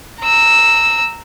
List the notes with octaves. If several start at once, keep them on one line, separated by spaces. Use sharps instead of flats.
A#5 E6